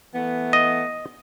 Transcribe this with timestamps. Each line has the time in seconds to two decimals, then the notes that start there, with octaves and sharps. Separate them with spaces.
0.14 E3 A3 B3
0.53 D#5